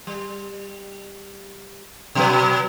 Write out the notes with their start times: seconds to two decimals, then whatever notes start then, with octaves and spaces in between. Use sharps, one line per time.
0.07 G3
2.15 B2 F#3 B4